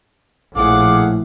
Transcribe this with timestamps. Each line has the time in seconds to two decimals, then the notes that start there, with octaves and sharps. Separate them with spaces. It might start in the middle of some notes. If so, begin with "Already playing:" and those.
0.56 A#1 A2 G#4 F5 F#5 D6